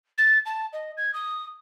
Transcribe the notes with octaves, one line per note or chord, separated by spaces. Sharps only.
A6
A5
D#5
G#6
D#6